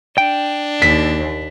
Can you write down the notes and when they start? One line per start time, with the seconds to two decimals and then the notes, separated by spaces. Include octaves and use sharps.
0.18 D4 G5
0.82 D#2 B6